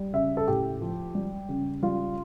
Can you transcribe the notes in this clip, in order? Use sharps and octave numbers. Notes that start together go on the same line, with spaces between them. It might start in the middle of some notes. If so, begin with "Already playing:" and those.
Already playing: G3
C#3 E5
A4
A2 G4
F3
G3
C#3
G3 F4